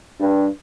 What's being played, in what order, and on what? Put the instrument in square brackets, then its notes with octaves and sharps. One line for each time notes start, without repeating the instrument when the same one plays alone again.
[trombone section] G2